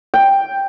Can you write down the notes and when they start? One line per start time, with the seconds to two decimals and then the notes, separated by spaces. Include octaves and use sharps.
0.14 G5